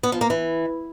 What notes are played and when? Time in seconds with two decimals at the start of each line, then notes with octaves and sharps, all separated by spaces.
0.03 B3
0.12 F3
0.21 A#3
0.30 E3